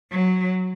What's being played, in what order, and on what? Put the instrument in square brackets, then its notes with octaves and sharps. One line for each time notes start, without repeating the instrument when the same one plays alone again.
[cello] F#3